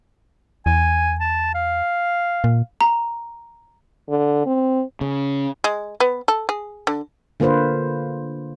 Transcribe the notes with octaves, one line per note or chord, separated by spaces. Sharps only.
E2 G#5
A5
F5
A#2
A#5
D3
C4
C#3
G#3
B3
A4
G#4
D3
D3 A#3 F4 B4 C5